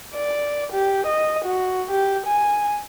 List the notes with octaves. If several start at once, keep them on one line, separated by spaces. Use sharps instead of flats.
D5
G4
D#5
F#4
G4
G#5